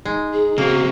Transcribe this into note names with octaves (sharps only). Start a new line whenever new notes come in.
G#3 D#4
G#4
C#3 A#3 C4 F#4